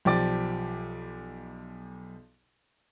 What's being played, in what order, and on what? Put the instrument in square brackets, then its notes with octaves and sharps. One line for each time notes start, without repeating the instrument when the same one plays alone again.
[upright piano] B1 F3 G4 D5 D6 A6